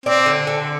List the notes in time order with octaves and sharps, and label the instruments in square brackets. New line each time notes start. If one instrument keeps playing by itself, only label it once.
[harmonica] C4 [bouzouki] D4
[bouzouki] D3
D3